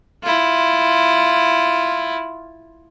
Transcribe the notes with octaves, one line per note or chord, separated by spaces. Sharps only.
E4 F4